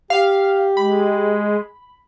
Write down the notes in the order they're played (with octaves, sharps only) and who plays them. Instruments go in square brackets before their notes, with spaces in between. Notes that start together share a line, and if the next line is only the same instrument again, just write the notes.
[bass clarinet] G4 [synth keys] F5
[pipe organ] G#3 [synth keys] B5